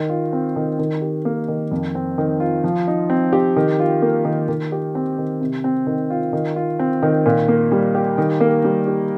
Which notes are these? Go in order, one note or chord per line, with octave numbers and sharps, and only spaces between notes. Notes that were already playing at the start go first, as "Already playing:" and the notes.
Already playing: D#3
F4
C4
D#3
D#3
G4
A#3
D#3
F2
C4
D#3
F4
F3
D#4
C4
G4
D#3
F4
A#3
D#3
D#3
G4
C4
D#3
C3
C4
D#3
F4
D#3
F4
C4
D#3
A#2
A#3
G3
G4
D#3
A#3
G3
G4